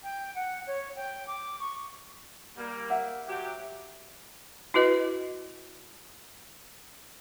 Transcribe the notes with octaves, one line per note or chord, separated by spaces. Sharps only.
G5
F#5
C#5
G5
D6
C#6
G3 A#3
E5 F#5
F#3 G4
E4 F#4 B4 D#5